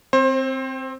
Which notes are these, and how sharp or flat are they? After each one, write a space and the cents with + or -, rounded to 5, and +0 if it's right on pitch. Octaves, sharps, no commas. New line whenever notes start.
C4 +0 C5 +30